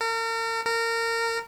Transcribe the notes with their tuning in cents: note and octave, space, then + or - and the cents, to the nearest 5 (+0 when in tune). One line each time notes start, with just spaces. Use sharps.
A#4 -40
A#4 -25